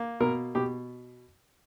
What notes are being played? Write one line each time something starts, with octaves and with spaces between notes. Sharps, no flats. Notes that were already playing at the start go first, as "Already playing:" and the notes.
Already playing: A#3
B2 A#4
B2 G4